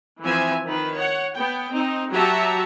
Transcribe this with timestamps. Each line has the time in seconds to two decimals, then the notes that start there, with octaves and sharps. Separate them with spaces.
0.24 E3 F3 C4 E5 G#5
0.65 D#3 B4
0.98 C#5 F#5
1.35 B3 G5
1.70 C4 D#4
2.13 F#3 F#4 G4 E5 A5 A#5